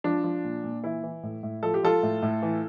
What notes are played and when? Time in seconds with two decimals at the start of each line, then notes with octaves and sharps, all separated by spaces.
0.04 F3 D4
0.24 F3
0.44 A#2
0.64 A#2
0.83 E3 E4
1.03 E3
1.23 A2
1.43 A2
1.63 F3 A4
1.74 G4
1.83 F3 F4 A4
2.03 A2
2.22 A2
2.42 E3